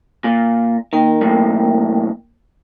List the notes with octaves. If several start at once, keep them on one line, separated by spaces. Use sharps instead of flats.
A#2
D#3 A#3 A#4 G5
B1 E2 A2